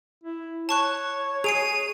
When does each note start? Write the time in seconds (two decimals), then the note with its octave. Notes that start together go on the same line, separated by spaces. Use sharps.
0.24 E4
0.69 C#5 A5 C#6 F#6
1.44 G#4 C7 D7 D#7 F7